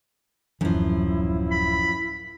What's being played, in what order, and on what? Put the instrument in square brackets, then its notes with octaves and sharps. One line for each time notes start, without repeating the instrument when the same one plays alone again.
[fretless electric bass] D1 E3 [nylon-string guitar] F#2 F3 [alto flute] E4
[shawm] B5